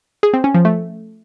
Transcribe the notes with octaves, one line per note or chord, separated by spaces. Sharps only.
G#4
C4
C#4
F3
A3